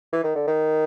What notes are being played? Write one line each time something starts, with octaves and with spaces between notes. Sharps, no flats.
E3
D#3
D3
D#3